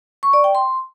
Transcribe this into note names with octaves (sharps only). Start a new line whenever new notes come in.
C#6
D5
G5
C6